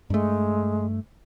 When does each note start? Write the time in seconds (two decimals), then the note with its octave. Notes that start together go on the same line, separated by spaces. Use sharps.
0.10 G2 G#3 A3